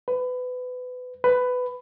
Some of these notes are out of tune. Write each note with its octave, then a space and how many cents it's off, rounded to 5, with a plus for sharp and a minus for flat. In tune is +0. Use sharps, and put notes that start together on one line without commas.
B4 +25
B4 +15